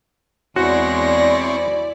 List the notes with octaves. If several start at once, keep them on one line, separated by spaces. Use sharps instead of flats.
E2 G#3 C4 E4 F#4 C#5 D5 A#6